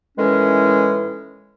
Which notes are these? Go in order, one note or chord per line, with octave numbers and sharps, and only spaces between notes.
A2 D#3 E3 G#3 C#4